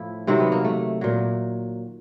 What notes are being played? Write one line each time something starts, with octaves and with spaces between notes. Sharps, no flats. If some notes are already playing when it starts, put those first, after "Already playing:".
Already playing: A2 F3 E4
C3 D#3 F#3 C4
B3
A#3
A3
A#2 F#3